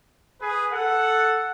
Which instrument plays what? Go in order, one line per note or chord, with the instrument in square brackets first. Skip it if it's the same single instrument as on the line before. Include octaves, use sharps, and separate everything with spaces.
[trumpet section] G#4 B4
A4 F#5